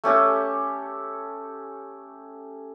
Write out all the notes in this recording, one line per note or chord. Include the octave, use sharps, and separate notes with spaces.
A3 C#4 G4 A4